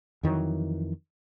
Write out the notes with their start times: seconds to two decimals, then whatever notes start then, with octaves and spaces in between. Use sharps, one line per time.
0.23 F2 D#3 E3 F#3